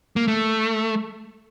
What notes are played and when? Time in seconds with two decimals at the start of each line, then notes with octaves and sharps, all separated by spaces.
0.16 A#3
0.28 A3